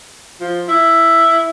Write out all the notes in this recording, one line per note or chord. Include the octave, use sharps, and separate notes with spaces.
F3
E4